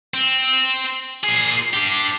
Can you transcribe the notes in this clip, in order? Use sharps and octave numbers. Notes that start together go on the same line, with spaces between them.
C4
A#2 G#4 C7
D4 G4